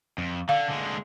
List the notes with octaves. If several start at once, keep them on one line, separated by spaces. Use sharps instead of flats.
F2
D3 F5
D3 G#3